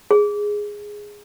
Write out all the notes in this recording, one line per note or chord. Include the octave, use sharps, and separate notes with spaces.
G#4